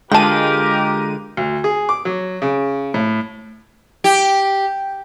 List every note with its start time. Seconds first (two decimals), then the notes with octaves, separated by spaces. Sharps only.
0.12 D3 G#3 F4 G4 A#4 G5 A5 D#7
1.37 D2
1.64 G#4
1.89 D6
2.05 F#3
2.42 C#3
2.94 A2
4.04 G4